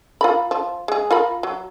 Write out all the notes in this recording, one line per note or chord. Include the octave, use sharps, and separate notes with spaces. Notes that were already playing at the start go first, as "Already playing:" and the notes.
F4 A#4 B5
F3
G#3 G#4
F4 A#4 B5
F#3